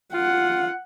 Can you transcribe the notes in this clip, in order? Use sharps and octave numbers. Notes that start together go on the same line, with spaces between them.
F4 F#5